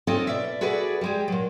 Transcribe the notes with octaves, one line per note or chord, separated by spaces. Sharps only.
C4 C#4 D#4 F4 A4 D#5
B2 D5 E5
F#4 G#4 A4 B4 D5
G3 G#3 G4
A#2 F#3